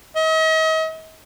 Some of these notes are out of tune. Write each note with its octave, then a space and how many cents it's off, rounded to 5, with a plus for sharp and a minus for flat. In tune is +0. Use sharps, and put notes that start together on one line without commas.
D#5 +40